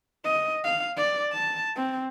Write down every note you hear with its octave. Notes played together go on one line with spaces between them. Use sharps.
D#5
F5
D5
A5
C4